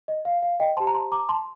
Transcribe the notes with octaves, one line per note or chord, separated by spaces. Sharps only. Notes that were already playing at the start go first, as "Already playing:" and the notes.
D#5
F5
F5
D#5 G5
G4 C5 A5 C6
A#5
A5 C6
A#5 D6
A5 C6